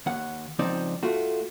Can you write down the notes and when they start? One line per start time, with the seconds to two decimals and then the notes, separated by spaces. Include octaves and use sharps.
0.06 D#2 F#5
0.59 C#2 F3 C4 D#4 D5
1.03 A3 F4 F#4